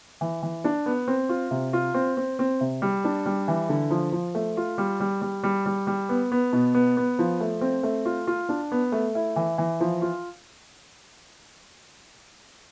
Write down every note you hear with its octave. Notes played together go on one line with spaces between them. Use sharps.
E3
E3
D4
B3
C4
F4
C3
F4
C4
C4
C4
C3
G3
D4
G3
E3
D3
F3
F3
A3
F4
G3
G3
G3
G3
G3
G3
B3
B3
B2
B3
B3
F3
A3
C4
A3
F4
F4
D4
B3
A3
E4
E3
E3
F3
F4